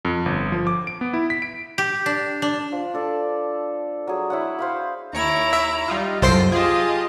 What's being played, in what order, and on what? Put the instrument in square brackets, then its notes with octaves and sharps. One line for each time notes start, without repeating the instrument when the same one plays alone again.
[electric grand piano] F2
G1
F3
D6
D7
B3
E4
B6
D7
[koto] G4
D4
D4
[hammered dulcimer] F3
D4 A4 D5
F#3 G#4
E4 C#5 F#5
C5 F5 B5
[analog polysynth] D#2 C#5 D7 [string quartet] E4 A#5
[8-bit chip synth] E5
[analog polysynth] G3 D#4 F4
[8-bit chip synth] C2 C5 C7 [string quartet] F#2 F4 [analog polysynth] A4 G5 A#6
[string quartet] F4 G4 D#5 [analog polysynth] G#4 A5